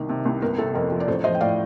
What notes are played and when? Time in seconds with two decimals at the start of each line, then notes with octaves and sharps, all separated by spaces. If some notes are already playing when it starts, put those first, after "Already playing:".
Already playing: C2 D#3
0.09 C3
0.25 C2
0.41 G1 A#4
0.58 C3 A4
0.74 F2 A#4
0.91 F3
1.00 D5
1.08 A1 A4 C5
1.24 F3 C5 D#5
1.35 G5
1.41 A2 D5 F5